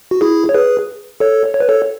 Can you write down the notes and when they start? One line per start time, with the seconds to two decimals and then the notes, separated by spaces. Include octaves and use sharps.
0.11 F#4
0.21 E4 G#4
0.49 C#5
0.54 G#4 B4
1.20 A4 C#5
1.54 C#5
1.60 B4
1.69 A4 C#5